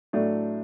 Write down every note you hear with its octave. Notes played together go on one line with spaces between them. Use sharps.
A2 F#3 A3 D4